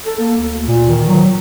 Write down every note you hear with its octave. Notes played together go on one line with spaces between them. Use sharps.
A4
A#3
D2
A#2
D#3
F#3